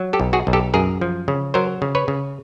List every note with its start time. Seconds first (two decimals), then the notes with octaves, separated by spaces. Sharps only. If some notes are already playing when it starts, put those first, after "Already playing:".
Already playing: F#3
0.13 G4 A4
0.20 B1
0.33 F#4 G#4
0.47 B1
0.53 G4 A4
0.74 F#2 G#4 A#4
1.01 F3
1.28 C#3
1.54 F#3 A#4 C5
1.82 C#3
1.95 B4 C#5
2.08 C#3